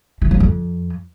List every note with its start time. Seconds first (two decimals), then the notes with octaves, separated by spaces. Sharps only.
0.22 E3
0.31 F3
0.40 F2